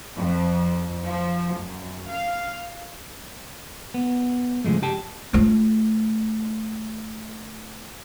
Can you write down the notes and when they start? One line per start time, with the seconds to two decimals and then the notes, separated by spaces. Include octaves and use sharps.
0.17 F2
1.05 F3
1.57 F#2
2.09 F5
3.94 B3
4.65 C#3 F3 G#3 A3
4.82 G4 G5 A5
5.33 A3 F4